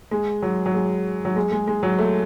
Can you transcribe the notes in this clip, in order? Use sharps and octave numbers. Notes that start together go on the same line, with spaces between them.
G#3
F#3
F#3
G#3
F#3
G#3
G#3
G#3
F#3
A3